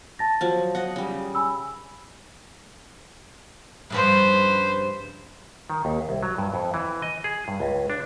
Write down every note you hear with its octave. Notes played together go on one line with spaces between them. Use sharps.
A5 A6 A#6
F3 F#3
F#4 D#5 F#5
C#3 G3
G#5 B5 E6
G2 C#3 F3 B4 C5
D#3
D#2
C2
F#3
G2
F2
E3
D#5
G#4
G2
C#2
D4